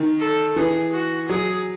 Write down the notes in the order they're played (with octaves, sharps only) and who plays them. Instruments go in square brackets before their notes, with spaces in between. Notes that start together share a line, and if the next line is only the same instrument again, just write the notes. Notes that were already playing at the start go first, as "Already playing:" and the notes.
Already playing: [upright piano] D#3
[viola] A4
[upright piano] E3 [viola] G#4
[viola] F#4
[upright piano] F#3 [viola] G#4